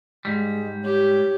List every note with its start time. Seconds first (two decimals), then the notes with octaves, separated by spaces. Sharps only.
0.25 G#2 G3 G#3
0.84 G4 C#5